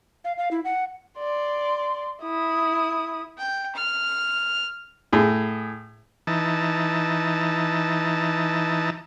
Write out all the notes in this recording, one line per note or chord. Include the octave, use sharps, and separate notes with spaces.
F5
F5
E4
F#5
D5 C6
E4 D#6
G5
F6
A2 G#4
E3 D#4 A5